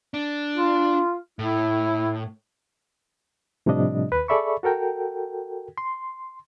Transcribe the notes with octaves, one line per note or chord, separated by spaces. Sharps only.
D4
F4
A2 E4
A2 C3 F3 G3 D4 D#5
D#2 B4
G#4 A4 D5 E5 B5 C#6
F#4 A4 A#4 G5
C6